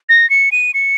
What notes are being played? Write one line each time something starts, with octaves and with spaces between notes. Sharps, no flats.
A#6
C#7
D#7
C#7